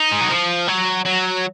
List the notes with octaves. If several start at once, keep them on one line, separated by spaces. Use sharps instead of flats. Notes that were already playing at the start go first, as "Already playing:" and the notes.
Already playing: D#4
G#3
F#3
F3
F#3
F#3